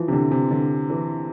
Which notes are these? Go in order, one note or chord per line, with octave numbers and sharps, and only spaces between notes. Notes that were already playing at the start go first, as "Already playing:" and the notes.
Already playing: E3 F3
C3
D3
C3
D3
E3